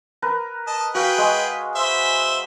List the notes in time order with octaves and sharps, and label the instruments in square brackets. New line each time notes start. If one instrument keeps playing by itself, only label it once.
[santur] A#4 B4
[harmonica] D#5 A5
[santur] F#4 F5 [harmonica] G#4 B4 G5
[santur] G#3
[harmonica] C5 E5